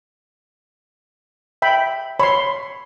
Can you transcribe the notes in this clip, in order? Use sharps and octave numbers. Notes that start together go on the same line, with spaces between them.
E5 G5 B5
C#5 B5 C6